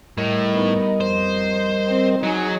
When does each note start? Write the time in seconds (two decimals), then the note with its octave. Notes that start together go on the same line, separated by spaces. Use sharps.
0.18 A2 G3 A#4 D#5
0.53 B3 D#4
1.00 F2 C5
1.87 C4
2.23 F#3 D#4 G#4